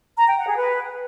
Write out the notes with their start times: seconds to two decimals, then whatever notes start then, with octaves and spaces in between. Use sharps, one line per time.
0.16 A#5
0.27 G5
0.37 F#5
0.47 G#4
0.57 B4